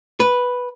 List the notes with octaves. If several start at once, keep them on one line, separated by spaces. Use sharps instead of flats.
B4